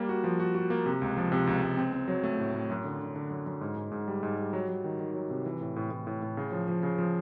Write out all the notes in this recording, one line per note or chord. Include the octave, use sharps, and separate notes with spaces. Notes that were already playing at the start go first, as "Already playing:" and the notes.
Already playing: G3 A#3
F#4
F3
F#4
F#4
A#3
C3
C#2
F3
C3
C#2
C#2
C4
C4
F#3
A3
A2
A2
F#2
D3
D3
D3
F#2
F#2
G#2
G#2
G#2
G3
G#2
G3
F#3
F#3
D#3
D#3
F#3
C3
E3
A2
A2
A2
A2
A2
C#3
F3
F3
C#3
F3